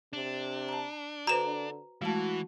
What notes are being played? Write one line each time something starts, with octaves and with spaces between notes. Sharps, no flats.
C3 D4
A5 A#5
D3 F#4 B4 C5 A#5 E7
E3 G#3 A3 F#4 A5